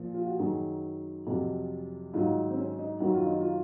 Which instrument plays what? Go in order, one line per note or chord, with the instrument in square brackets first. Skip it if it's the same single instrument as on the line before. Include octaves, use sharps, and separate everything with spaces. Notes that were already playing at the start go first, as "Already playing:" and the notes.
Already playing: [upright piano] A#2 F3
F4
F#4
F#2 D#3 F#3 G#4
F2 C3 F#3
G#2 D#3 F#3 F4
C4
C#4
D#4
F#2 D#3 F#3 F#4
F4
D#4
F4